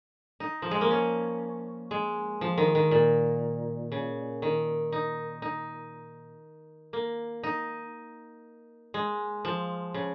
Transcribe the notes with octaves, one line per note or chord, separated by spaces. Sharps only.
D#4
F3
G#3
A#3
C#4
G#3
F3
D#3
D#3
A#2
C#3
D#3
D#4
D#4
A#3
D#4
G#3
F3
C#3